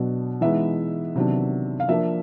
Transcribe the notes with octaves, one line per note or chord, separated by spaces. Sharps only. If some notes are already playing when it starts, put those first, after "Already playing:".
Already playing: B2 F#3 B3 D4
E3 G#3 B3 D#4 E5
C3 D#3 F#3 B3 D4
F5
F3 A#3 D4 E5